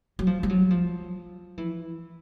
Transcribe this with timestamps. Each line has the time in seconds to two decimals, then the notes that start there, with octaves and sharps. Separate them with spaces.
0.19 F#3
0.27 F3
0.43 G3
0.49 F#3
0.70 F3
1.57 E3